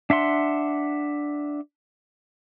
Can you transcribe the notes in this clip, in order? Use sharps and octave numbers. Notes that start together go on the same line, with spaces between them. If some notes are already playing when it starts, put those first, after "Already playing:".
D4 E5 F#5 C6